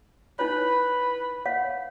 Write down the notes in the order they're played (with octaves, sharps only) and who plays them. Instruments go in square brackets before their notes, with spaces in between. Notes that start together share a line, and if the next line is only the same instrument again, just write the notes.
[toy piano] D#4 E4 C#5 [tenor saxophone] B4
[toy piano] C#5 F5 F#5